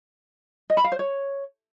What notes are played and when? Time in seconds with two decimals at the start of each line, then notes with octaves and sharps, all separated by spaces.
0.70 D#5
0.77 B5
0.84 F5
0.92 C5
0.99 C#5